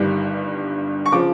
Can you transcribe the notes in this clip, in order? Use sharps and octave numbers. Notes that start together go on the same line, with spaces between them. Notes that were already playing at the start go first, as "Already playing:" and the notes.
Already playing: G1 G2 D#3 G3
C#6
C#3 F3 D6